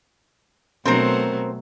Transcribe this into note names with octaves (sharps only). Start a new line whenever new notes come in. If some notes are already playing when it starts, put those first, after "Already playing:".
B2 F#3 A3 C4 A#4 C5